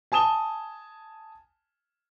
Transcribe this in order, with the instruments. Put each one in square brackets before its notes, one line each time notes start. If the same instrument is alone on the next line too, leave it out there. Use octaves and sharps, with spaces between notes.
[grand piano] G#5 A5 D#6 E7 G7